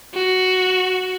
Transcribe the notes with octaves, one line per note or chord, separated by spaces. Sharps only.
F#4